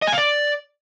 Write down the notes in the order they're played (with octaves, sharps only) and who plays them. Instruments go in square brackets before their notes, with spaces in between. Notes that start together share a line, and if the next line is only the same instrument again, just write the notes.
[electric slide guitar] D#5
G#5
F5
D5